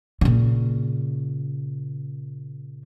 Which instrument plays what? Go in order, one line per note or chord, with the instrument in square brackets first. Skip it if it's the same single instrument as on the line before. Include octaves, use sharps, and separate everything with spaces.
[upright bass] A#2 C#3